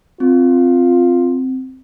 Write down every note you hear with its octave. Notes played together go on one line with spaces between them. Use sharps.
C4 F4